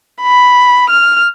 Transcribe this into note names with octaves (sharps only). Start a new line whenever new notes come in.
B5
F6